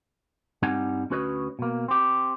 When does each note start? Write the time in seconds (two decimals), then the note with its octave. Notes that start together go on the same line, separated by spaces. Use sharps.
0.62 G2 G3 C4 D#4 F#5 G#5
1.10 D2 C#4 F#4 B4 C#5 D#5
1.59 B2 A#3
1.88 C4 G4